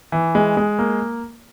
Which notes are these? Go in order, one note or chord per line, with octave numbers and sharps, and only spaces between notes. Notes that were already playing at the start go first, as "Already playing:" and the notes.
E3
G#3
G#3
A#3